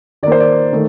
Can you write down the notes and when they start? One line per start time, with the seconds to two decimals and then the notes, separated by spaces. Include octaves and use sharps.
0.23 D#3 D5
0.27 A#3 C5
0.40 D5
0.73 D#3 A3